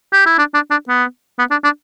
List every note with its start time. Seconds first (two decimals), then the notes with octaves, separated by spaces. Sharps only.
0.13 G4
0.26 E4
0.38 D4
0.54 D4
0.71 D4
0.89 B3
1.39 B3
1.51 D4
1.64 D4